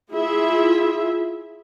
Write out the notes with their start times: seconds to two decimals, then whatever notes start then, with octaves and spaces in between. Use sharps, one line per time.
0.12 E4 F4 G#4 E5